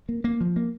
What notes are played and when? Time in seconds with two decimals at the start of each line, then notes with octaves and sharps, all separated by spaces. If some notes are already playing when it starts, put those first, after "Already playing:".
0.09 A#3
0.24 A#3
0.41 F3
0.56 A#3